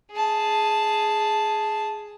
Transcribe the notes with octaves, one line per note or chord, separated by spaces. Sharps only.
G#4 A5